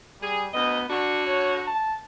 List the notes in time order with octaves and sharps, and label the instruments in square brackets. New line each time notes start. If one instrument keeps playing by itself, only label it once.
[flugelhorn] G3 [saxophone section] G#4
[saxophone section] D2 D#5 [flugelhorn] B3
[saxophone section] D3 F#4 [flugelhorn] D4
[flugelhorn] C#5
A5